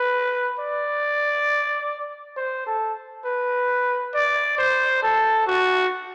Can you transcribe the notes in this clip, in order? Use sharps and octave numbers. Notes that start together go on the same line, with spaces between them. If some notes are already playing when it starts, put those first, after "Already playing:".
Already playing: B4
D5
C5
A4
B4
D5
C5
A4
F#4